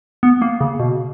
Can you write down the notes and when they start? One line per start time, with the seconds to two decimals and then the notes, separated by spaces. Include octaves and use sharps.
0.23 B3
0.42 A#3
0.61 C#3
0.80 B2